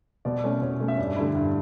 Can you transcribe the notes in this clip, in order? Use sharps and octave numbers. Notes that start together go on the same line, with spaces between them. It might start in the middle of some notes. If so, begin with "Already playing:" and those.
B2 D5
A3 C#4
B2 C#5
A3 C#4
E5
G2 D5
D3 A3 E4
G2